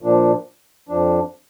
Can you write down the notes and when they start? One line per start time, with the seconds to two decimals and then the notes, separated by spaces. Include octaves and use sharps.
0.01 A#2 F3 D4
0.89 F2 F3 D4